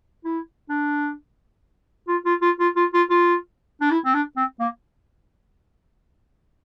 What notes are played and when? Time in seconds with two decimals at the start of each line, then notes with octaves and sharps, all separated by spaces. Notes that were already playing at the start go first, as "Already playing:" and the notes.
0.25 E4
0.70 D4
2.08 F4
2.25 F4
2.42 F4
2.60 F4
2.76 F4
2.94 F4
3.10 F4
3.81 D4
3.91 E4
4.05 C4
4.14 D4
4.37 C4
4.60 A#3